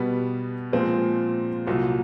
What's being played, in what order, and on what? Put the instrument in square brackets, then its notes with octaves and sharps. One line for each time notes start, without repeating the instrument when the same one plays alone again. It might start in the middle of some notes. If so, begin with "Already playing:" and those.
Already playing: [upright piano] B2 G3 B3
A#2 F3 G#3 C4
C2 A#2 F#3